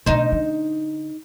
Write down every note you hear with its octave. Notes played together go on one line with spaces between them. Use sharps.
B2 D3 D#4 C5
D3